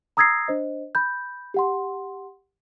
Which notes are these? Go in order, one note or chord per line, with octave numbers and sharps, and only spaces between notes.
A#5 D#6 E6 G#6 A#6 C7
D4 C5 D#5
B5 G6
G4 F#5 C6